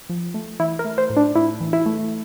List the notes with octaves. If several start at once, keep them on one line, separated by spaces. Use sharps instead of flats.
F3
A3
E3 E4
A#4
A3
C5
A2
D4
A2 E4
E3
E4
A3